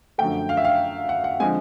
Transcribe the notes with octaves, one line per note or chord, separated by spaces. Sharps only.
F#2 D3 F3 A3 G5
F5
E5
F5
F#5
F#5
D3 F3 G#3 C4 G#5